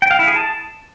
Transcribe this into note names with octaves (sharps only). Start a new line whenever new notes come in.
G5
F5
E4
G#4
A5